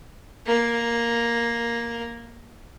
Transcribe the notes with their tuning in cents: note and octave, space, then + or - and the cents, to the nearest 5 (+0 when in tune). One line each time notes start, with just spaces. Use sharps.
A#3 +5